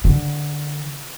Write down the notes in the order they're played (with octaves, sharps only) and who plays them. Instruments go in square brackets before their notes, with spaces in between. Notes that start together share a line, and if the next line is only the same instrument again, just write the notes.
[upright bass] D3